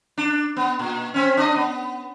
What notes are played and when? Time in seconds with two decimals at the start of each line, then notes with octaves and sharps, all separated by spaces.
0.18 D4
0.57 B3
0.79 A#2
1.14 C4 C#4
1.37 D4 D#5
1.56 B3